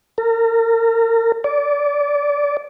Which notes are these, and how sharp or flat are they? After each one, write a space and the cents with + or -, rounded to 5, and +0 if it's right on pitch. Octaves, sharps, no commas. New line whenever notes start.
A#4 -30
D5 -20